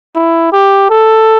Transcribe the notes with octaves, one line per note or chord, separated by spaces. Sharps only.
E4
G4
A4